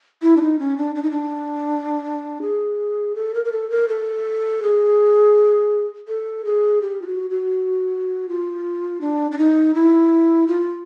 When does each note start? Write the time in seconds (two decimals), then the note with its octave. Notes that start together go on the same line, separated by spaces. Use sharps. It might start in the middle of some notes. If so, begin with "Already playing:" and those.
0.22 E4
0.37 D4
0.41 D#4
0.59 C#4
0.78 D4
0.95 D4
1.03 D#4
1.11 D4
2.42 G#4
3.15 A4
3.34 A#4
3.45 A#4
3.52 A4
3.70 A#4
3.88 A4
4.63 G#4
6.08 A4
6.45 G#4
6.82 G4
7.02 F4
7.07 F#4
7.30 F#4
8.29 F4
9.01 D4
9.32 D4
9.38 D#4
9.74 E4
10.48 F4